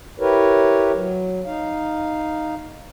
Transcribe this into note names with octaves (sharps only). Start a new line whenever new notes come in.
E4 G4 A#4 B4 C#5
F#3
D#4 F5